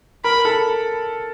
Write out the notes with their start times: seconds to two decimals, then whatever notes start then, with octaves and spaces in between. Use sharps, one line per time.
0.24 A#4 B5
0.45 A4